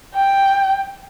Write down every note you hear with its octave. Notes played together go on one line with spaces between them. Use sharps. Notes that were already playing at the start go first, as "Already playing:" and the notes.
G5